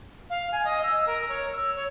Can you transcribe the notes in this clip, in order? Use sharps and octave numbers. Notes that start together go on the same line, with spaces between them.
F5
G#5
D#5
E6
A#4
C#5
E6
C#5